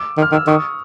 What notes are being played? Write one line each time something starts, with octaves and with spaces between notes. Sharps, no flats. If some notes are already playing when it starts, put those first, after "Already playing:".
Already playing: D6 E6
D#3
F6
D#3
E6
D#3 C#6 D#6